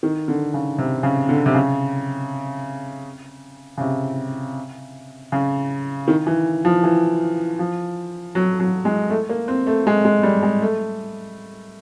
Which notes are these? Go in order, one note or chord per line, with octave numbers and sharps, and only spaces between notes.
D#3
D3
C#3
C3
C#3
D3
C3
C#3
C#3
C3
C#3
D#3
E3
F3
E3
F3
F#3
F#3
G#3
A3
A#3
C4
A3
G#3
G#3
G3
G#3
A3